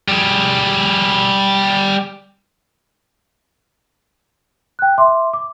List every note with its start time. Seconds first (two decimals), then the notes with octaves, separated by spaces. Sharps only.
0.08 G3 G#4
4.79 G5 F#6
4.98 E5 C6 D6
5.33 D6